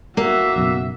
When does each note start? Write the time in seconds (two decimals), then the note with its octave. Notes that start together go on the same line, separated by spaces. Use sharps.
0.17 A#3 F#4 E5
0.56 F#1 B1 F#2